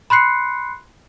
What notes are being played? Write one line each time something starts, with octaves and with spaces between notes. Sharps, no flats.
B5 C6 F#6 C7 C#7